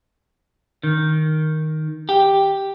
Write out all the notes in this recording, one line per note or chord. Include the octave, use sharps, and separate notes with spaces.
D#3
G4